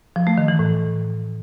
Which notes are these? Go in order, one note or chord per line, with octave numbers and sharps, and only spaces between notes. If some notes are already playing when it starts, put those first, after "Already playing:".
F3
A3
D#3
E3
A2